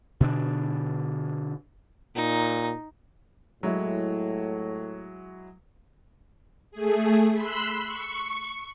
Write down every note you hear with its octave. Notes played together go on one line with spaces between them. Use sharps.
B2 D3 D4
A#2 D#4
A2 F#3 G#3 E4
A3 G#4
B5 C6 E6 F#6
C#6